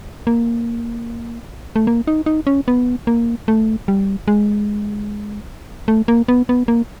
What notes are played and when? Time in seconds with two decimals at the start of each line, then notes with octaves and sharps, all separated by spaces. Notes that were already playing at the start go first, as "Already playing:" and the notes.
0.27 A#3
1.76 A3
1.87 A#3
2.07 D#4
2.26 D#4
2.47 C#4
2.68 B3
3.07 A#3
3.48 A3
3.88 G3
4.28 G#3
5.88 A3
6.08 A#3
6.28 B3
6.49 B3
6.68 A#3